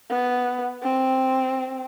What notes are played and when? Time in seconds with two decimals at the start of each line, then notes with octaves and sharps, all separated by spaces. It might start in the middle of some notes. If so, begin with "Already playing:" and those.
0.10 B3
0.83 C4